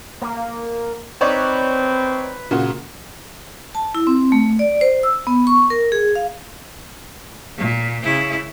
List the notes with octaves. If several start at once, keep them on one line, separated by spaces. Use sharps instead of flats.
A#3
C4 D#4 B4 C#5 D5
A#2 C#3 F#4
A5
E4
C4
A3
D5
C5
E6
B3
C#6
A#4
G#4
F5
A#2
C#3 E4